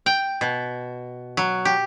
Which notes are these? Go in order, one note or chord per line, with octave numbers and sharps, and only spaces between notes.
G5
B2
F#3
G4